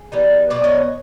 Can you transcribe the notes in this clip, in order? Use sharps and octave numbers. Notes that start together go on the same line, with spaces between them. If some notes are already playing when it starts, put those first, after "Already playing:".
Already playing: G#4
E3 G3 B3 D#4
B2 F#3 B3 D5
C#5 D#5